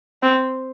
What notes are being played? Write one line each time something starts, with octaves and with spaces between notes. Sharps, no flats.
C4